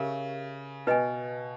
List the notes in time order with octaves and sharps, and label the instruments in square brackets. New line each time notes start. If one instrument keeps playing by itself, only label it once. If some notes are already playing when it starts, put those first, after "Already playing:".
Already playing: [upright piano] C#3 [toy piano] G4 A#4 E5
[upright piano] B2 [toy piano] B4 D#5 G#5